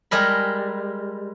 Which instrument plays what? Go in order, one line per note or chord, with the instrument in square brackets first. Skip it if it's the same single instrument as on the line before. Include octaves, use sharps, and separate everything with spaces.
[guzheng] G3 G#3 A#4 B5